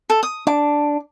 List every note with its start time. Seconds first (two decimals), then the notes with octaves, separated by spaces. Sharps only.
0.10 A4
0.23 D#6
0.47 D4 D6